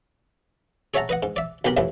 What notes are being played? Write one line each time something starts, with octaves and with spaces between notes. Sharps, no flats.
G#4 C#5 E5 F#5 A5 A#5
B4 D#5 F#5
G#2
D5 E5
B1 B2 G4 A#4 B5
C2 F2 A2 E3